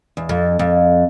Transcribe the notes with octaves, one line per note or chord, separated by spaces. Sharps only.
E2
F2
F2